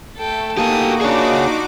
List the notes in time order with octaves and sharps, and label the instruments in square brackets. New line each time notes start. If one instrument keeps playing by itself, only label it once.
[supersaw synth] A3 [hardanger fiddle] A4 G5
[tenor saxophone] A#3 [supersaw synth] D#4 F#4 D6 [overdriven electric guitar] G4 A4 [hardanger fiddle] D#6
[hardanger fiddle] D4 F4 [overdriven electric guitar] G#4 C#5